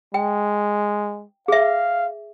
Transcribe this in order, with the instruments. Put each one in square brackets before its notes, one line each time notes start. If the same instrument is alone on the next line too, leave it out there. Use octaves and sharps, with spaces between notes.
[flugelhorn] G#3 [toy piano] G5
[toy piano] G#4 E5 [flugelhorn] F5